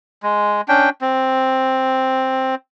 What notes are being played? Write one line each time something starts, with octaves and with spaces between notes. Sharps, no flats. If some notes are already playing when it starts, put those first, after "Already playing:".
G#3
C#4 D4 G5
C4